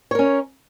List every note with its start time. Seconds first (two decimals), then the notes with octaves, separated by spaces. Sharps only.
0.11 C#5
0.15 A#4
0.19 C#4